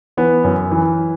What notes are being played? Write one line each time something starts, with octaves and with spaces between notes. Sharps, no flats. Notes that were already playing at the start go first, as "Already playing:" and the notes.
E3 B3
F#2
E3